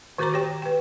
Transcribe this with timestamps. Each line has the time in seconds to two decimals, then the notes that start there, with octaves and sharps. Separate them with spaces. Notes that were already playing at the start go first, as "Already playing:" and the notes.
0.18 D#3 F#4 A#4 C5 A#5 D6
0.33 G4 C#5 G5
0.62 B4 G5